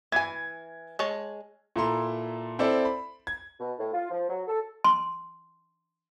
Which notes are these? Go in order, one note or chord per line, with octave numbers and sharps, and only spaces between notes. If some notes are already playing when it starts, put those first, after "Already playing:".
E3 G#5 G#6
G#3 C#5 A5
A#2 E4 A4 A#5 C6
C4 E4 A4 D5
B5
G#6
B2
A2
F4
F3
F#3
A4
C6